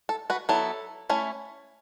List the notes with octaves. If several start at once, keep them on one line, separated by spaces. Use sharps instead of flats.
A4
F#4 B4
F#3 B3 E4 A4
A3 C#4 E4